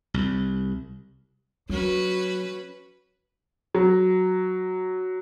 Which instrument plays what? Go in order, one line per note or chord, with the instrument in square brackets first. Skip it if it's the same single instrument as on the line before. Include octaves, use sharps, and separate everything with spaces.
[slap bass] C2
[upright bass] F#3 [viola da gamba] C#4 F#4 B4
[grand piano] F#3